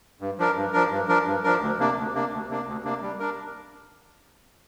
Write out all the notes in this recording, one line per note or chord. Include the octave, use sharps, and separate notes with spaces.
G2
F3 D4 A#4
G2
F3 D4 A#4
G2
F3 D4 A#4
G2
F3 D4 A#4
D2
C3 A#3 D4
D2
C3 A#3 D4
D2
C3 A#3 D4
D2
C3 A#3 D4
G3
D4 A#4